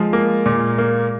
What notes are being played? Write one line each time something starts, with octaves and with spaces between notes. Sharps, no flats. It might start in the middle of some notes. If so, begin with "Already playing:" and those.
Already playing: F3 G#3
A#3
A#2
A#3